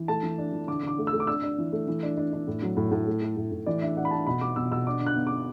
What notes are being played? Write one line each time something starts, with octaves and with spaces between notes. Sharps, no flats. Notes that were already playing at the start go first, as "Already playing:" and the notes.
Already playing: E3
A3 A5
E3
D4
E3
D3 D6
D3 D6
A3
E6
A3
D6
D4 E6
D4
E3
A3
E3
D4
D4
D4
A2
F#3
A2
A2
A3
A3
A2
A2
E3 D5
D4 E5
D4 F#5
B5
D4 A5
B2 B5
B3 D6
B2 E6
B2 E6
D4 D6
D3
F#6
B3
D6
B3